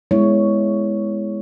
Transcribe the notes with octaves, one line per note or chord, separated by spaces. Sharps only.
G#3 B3 E4 C#5